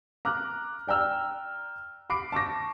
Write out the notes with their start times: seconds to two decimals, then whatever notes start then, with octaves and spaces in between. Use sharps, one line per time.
0.25 A#5 D6 F6 F#6
0.87 D5 G5 A#5 E6 F6
2.10 B5 D6 C7 D7
2.32 A5 C#6 D6 A#6